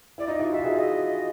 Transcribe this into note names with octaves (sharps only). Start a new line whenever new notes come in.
E4 D5
D#4 F4 D#5
E4 F#4
F4 G4 E5
F#4 G#4
D#5